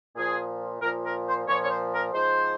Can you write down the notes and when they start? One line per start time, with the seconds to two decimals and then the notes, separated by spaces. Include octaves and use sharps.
0.16 A#2 F3 G#4
0.82 A#2 F3 A#4
1.04 A#4
1.27 C5
1.48 A#2 F3 C#5
1.63 C#5
1.70 C5
1.93 A#4
2.14 G#2 F3 C5